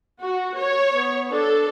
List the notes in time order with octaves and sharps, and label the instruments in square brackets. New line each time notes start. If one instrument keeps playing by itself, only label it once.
[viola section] F#4
C#5
[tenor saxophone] B3
[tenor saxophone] D4 [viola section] A4